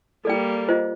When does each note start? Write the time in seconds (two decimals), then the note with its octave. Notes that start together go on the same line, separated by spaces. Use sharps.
0.25 G3 A#3 A4 D5 G5
0.69 F4 C5 D#5